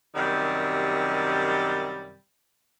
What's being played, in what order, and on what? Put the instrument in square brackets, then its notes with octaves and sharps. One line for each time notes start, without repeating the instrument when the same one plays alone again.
[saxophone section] F#2 C3 D#3 G3